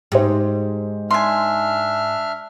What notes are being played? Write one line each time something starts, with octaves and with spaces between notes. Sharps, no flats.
G#2 G4 C5
D4 E5 G#5 C6 F6